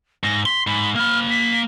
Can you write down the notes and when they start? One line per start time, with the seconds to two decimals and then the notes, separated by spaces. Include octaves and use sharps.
0.24 G#2 A#6
0.46 C6 B6
0.67 G#2 B5
0.96 A#3 B5 F6
1.30 B6